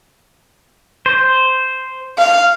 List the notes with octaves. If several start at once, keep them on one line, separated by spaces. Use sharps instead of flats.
C5
F5